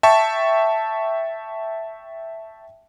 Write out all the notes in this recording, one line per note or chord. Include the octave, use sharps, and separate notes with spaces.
E5 G5 A5 C#6